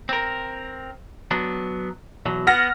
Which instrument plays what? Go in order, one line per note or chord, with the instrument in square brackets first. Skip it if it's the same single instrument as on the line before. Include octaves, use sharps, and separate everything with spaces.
[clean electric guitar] C4 A#4
F#3 B3 D4
E2 B2 F#3
[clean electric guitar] B3 [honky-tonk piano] F#5 F6 A#6